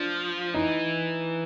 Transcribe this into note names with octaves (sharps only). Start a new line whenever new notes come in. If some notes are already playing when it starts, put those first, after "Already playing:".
Already playing: F3 D4
E3 D#4